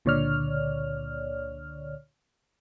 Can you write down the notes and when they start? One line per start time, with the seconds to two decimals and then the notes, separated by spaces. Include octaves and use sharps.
0.05 C#2 A#2 D3 C#5 D5 F6